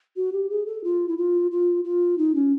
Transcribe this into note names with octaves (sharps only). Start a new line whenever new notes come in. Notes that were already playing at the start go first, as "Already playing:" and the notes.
F#4
G4
G#4
A4
F4
E4
F4
F4
F4
D#4
C#4